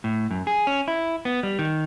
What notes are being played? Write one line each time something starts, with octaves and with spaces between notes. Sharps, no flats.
A2
F#2
G#4
C#4
E4
B3
G3
D#3